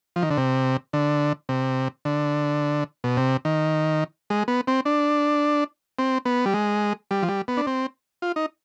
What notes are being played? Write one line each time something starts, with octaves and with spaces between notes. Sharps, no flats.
F3
D#3
D3
C3
D3
C3
D3
B2
C3
D#3
G#3
B3
C4
D4
C4
B3
G3
G#3
G3
F3
G3
B3
D4
C4
F4
D#4